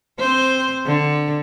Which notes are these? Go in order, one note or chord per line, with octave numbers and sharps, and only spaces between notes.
C4 C5
D3